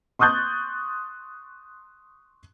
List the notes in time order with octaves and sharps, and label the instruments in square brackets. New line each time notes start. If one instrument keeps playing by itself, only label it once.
[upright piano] C6 C#6 D#6 F#6 G6 A6